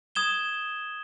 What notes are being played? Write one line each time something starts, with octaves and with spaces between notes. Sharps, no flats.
D#6 G#6 E7 G7